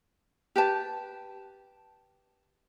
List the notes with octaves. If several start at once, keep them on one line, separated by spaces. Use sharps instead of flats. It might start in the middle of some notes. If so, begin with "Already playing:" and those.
G4 B4 A5